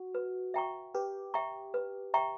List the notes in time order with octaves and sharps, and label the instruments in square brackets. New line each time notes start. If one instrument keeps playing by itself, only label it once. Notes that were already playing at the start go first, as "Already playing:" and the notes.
Already playing: [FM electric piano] F#4
[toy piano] B4
E5 G5 A#5 C#6
[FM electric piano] G4 [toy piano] B4
[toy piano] E5 G5 A#5 C#6
B4
E5 G5 A#5 C#6